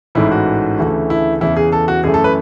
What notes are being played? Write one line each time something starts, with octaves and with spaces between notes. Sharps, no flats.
A1 G#2 E3 A3 E4
F#4
D2 C#3 E3 A3
E4
E2 C#3 E3 E4
G#4
A4
F#4
F#2 E3 A3 G#4
A4
B4